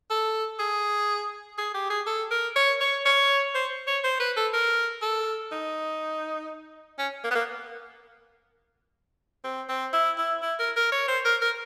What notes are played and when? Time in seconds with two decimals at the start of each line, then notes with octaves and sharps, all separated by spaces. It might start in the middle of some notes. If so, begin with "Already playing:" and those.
0.10 A4
0.59 G#4
1.58 G#4
1.74 G4
1.90 G#4
2.07 A4
2.31 A#4
2.56 C#5
2.81 C#5
3.06 C#5
3.55 C5
3.87 C#5
4.04 C5
4.20 B4
4.37 A4
4.53 A#4
5.02 A4
5.52 D#4
6.99 C#4
7.24 A#3
7.31 B3
7.35 A#3
9.44 C4
9.69 C4
9.93 E4
10.18 E4
10.42 E4
10.59 A#4
10.76 A#4
10.92 C#5
11.08 C5
11.25 A#4
11.42 A#4